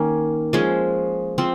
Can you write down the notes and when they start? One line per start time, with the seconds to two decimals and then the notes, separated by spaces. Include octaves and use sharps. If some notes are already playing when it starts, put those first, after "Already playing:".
Already playing: D#3 A#3 C#4
0.53 F3 G#3 C#4
1.38 F3 C4